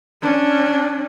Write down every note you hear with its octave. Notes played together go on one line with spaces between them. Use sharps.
C#4 D4